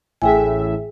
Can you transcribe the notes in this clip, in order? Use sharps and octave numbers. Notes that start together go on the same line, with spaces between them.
A1 A2 G#4 E5 G5 G#5